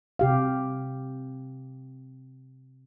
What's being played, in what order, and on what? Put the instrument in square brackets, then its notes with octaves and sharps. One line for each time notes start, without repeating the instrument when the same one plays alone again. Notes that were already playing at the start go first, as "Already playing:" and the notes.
[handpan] C3 G4 F5